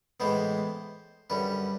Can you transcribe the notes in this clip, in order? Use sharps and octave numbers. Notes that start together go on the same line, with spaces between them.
A2 E3 G#3 B3 C5
F#2 D3 G3 B4